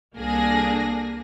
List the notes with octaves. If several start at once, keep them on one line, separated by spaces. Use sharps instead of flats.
C2 A#3 D4 G#4 A4 A#6